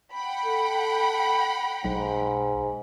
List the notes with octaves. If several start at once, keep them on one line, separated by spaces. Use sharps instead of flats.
F#5 G5 B5
A4
B1 G#2